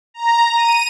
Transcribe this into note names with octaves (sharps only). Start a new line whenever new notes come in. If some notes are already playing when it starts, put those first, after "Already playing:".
A#5
D#7